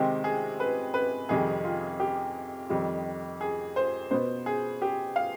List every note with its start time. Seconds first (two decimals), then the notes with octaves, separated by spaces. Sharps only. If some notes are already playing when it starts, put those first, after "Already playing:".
Already playing: C3 D#3 G#3 C4 G4
0.24 G#4
0.60 B4
0.94 B4
1.29 F2 C3 D#3 G3 G#4
1.64 F4
2.00 G4
2.70 F2 D#3 G3
3.41 G#4
3.76 C5
4.11 B2 B3 C5
4.46 G#4
4.82 G4
5.16 F5